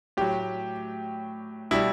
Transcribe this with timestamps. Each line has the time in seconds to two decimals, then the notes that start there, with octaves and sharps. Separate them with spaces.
0.17 A2 F#3 G4
1.71 B2 G3 E4